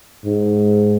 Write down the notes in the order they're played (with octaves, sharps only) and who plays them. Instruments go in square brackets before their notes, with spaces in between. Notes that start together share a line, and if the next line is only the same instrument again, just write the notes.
[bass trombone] G#2